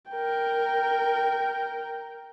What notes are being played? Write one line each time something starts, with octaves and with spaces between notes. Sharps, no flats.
A#4 G5